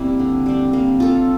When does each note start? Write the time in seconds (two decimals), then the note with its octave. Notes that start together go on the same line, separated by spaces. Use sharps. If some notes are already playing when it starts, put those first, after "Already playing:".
Already playing: G3 A#3 C4 E4 G4
0.19 D3
0.46 G3 D4
0.73 A#3
1.00 F4 A4